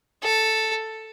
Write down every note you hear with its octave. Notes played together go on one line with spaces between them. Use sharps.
A4